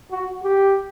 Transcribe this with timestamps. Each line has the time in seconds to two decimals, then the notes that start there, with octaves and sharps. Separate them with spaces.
0.11 F#4
0.44 G4